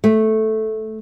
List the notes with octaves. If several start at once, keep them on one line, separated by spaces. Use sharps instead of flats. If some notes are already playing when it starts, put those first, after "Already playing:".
A3